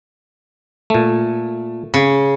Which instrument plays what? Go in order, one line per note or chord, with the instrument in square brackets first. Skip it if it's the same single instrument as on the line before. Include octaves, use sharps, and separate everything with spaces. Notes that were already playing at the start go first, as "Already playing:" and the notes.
[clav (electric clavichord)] A#2 A3
[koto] C#3